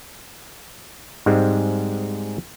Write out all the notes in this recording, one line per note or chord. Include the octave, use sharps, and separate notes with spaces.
G#2 G3 G#3 C4